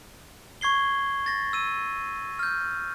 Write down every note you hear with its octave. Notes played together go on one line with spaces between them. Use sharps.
C#6 G#6 C7 G7
A6 A#6
E6 D#7
F6 G6